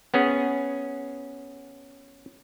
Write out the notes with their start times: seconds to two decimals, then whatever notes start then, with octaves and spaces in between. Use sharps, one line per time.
0.14 B3 C#4 G#4